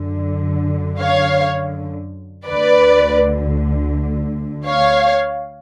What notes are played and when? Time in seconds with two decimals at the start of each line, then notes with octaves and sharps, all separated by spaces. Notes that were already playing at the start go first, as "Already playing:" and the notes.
Already playing: F#2 D3
1.00 C#5 F5
2.47 D2 D3 B4 D5
4.67 C#5 F5